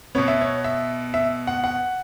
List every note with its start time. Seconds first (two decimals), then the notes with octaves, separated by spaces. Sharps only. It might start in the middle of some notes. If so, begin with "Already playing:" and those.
0.15 B2 B3 C#5
0.28 E5
0.41 C#5
0.64 E5
1.14 E5
1.47 F#5
1.64 F#5